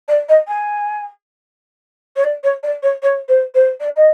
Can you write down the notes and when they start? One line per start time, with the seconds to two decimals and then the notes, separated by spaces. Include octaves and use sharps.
0.08 D5
0.29 D#5
0.48 G#5
2.16 C#5
2.24 D5
2.44 C#5
2.63 D5
2.83 C#5
3.03 C#5
3.29 C5
3.55 C5
3.80 D5
3.96 D#5